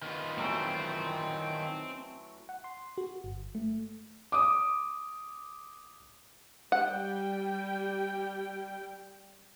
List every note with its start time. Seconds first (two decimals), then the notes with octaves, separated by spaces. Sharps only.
0.02 D#3 B3 F4
0.38 E3 F#3 A3 C4
2.49 F#5
2.64 C6
2.98 F#4
3.24 G1
3.55 A3
4.32 D6 D#6
6.72 G3 F#5 G5